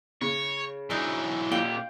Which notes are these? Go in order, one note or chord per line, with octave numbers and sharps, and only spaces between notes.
C#3 C#5
E3 F#3 D4 D#4
A#2 F4 G4 F5 G5 F#7